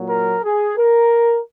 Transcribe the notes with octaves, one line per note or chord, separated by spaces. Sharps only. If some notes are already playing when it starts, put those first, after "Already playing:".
Already playing: A#2 F#3
A#4
G#4
A#4